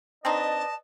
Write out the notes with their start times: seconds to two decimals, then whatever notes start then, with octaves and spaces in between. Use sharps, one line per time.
0.25 C4 D4 D#4 B4 D5 D#5 A5